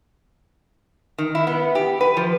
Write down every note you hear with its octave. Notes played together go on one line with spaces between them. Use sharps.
D#3
E4
B3
G4
B4
F3